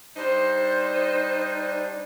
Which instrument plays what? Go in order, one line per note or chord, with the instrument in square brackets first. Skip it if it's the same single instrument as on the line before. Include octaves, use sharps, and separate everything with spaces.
[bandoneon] G3 D4 [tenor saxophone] D#4 [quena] C5